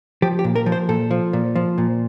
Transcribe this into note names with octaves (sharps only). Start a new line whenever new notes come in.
F3 G4
G4
A#2
A#4
F3
C5
A#2 A4
F3
A#2
F3
A#2